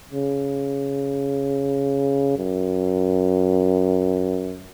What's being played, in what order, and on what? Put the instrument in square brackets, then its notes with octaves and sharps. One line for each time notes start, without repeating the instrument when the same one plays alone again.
[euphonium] C#3
F#2